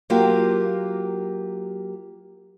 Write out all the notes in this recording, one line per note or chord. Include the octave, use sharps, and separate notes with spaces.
F#3 A#3 F4 G4 A#4